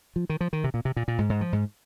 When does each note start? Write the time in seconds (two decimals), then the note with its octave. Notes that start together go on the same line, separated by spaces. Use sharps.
0.16 F3
0.29 D#3
0.41 F3
0.53 D#3
0.64 C3
0.74 A#2
0.85 C3
0.96 A#2
1.08 A#2
1.18 G#2
1.29 G#2
1.41 F3
1.53 G#2